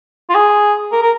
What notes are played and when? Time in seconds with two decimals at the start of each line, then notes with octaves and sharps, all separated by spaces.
0.30 F4
0.35 G#4
0.92 A#4
1.02 A#4